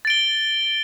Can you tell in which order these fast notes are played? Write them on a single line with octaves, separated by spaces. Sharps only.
A6 D7 G7